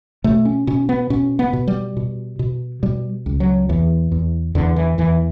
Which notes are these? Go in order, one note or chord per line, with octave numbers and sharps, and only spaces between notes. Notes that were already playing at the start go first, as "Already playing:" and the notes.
B2 A3
C#4
B2 C#4
B3
B2 C#4
B3
B2
G3
B2
B2
B2 G3
C#2
F#3
E2 E3
E2
E2 D3
E3
E2 E3